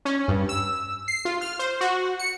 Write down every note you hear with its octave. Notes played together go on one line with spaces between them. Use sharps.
C#4
G2
E6
C7
F4
F6
C5
F#4
C#7